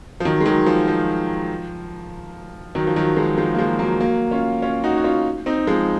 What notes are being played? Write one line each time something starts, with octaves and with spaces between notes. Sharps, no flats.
F3
D#3 F#3
G#3
D#3 F#3
F3
F3
D#3 F#3
F3
D#3 F#3
F3 G#3
F3 G#3
A#3
F3 G#3
F#3 A#3
F#3 A#3
C#4 F4
C#4 F4
D#4 F#4
F#4
C#4 F4
C4 D#4
F3 G#3